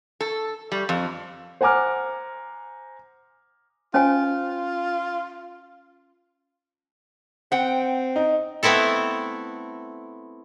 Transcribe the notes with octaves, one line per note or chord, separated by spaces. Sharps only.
A4
G3
F2
C5 F#5 G#5 A#5 D6 F6
C#4 F4 C5 G#5
C4 F#5 G5
D#4
A3 B3 C4 E4 A4